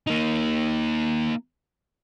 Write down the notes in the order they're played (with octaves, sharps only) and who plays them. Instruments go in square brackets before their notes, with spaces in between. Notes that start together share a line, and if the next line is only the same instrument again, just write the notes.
[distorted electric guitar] A#3 D#4